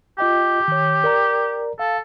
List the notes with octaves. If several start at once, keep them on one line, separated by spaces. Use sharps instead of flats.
F4 G4 D#5 G5
D#3 C#5
A#4 D5 A#5
A4 F5